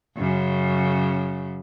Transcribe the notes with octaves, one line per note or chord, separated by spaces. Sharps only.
F#2 C#3